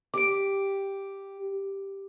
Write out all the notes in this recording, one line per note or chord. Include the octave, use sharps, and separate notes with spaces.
G4 D6 D7